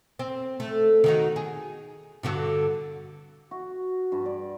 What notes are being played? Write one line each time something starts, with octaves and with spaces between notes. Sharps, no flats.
C4
A3
D#3 D#4 F#4
G#4
G2 D3 F#4
F#4
G2
D5